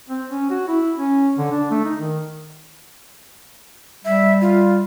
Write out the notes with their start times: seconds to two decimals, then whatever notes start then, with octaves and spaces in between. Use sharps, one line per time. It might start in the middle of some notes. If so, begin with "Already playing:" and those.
0.09 C4
0.31 C#4
0.50 F#4
0.68 E4
0.96 C#4
1.38 D3
1.51 D4
1.71 A3
1.85 D#4
2.00 D#3
4.05 G3 E5
4.41 F4